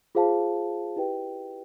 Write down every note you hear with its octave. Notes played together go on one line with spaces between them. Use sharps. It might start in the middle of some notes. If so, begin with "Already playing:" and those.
F4 G#4 C5 F5 A5
E4 G4 B4 D#5 G5